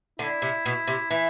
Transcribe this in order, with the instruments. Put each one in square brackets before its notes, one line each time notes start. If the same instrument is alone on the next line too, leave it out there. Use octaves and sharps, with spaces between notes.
[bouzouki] D3 [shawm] E4
[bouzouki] C3
B2
C3
[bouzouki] E3 [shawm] E4